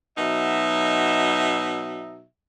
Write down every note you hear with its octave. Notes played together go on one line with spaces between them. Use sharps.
B2 F#3 D#4 E5